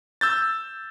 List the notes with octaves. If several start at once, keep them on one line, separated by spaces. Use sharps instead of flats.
E6 G6 A6